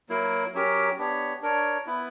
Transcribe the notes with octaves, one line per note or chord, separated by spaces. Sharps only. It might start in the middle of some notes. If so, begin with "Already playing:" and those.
F#3 A#3 E4 A#4
F#3 C#4 G4 A#4
B3 D4 G4 C#5
D4 A#4 C#5
B3 E4 B4